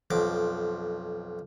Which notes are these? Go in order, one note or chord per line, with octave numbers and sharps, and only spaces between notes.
B1 F2 D6